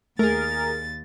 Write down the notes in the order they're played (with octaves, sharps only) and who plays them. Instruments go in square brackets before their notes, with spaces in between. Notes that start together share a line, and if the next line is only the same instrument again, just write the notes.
[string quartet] D#2 A6 [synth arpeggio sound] A3 [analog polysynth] G#4 A#4